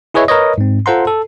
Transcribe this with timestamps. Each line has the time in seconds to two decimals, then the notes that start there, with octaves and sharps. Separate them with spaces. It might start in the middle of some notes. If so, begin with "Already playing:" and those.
0.14 E4 G#4 B4 C#5 D#5 E5
0.28 A#4 B4 C#5 D#5
0.58 G#2 C4
0.86 F4 A4 C5 F#5 A#5 C6
1.07 A4